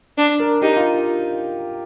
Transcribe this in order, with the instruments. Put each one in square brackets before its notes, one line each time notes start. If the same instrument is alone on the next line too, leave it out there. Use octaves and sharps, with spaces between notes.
[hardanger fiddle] D4
[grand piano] A#4
[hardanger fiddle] D#4 [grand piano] G4
[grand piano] F4